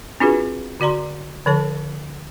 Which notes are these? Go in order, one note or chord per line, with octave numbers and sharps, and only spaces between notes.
C4 D4 F4 F#4 G#4 B4
D3 F#4 D5 A#5 C6
D3 F3 A4 C#5 A5